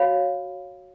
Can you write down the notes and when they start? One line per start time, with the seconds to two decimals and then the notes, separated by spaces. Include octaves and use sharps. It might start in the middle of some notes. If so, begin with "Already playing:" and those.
Already playing: F#4 C#5 F5 B5